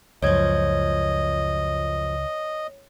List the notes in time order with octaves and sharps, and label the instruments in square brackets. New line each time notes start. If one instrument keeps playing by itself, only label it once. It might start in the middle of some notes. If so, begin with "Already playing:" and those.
[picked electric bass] C#2 [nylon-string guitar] F#2 F3 [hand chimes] C#5 G#6 [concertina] D#5